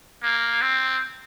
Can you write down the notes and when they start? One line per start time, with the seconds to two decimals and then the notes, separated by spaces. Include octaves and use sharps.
0.22 A#3
0.62 C4